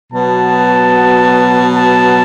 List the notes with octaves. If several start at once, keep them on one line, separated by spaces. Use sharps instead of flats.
B2 F#3 B3 A5
A5